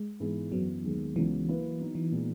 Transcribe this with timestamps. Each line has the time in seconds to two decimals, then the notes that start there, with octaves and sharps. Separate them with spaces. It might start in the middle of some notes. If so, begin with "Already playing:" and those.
Already playing: G#3
0.20 G#2 E3 B3 E4 G#4
0.52 F#2 E3 F#3 B3
0.83 D#2 D#3 G#3 B3
1.16 C#2 C#3 E3 F#3 B3
1.48 F#3 A#3 E4 B4
1.80 F#3 B3 D#4
1.95 E3
2.11 A#2 G#3 B3 D#4